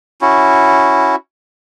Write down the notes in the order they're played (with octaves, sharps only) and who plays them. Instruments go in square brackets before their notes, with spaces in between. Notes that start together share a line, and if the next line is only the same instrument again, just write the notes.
[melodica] C#4 E4 F#4